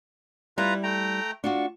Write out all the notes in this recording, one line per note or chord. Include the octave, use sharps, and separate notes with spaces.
G3 E4 F4 B4 A#5
A3 G5 A#5
D4 F4 F#4 C#6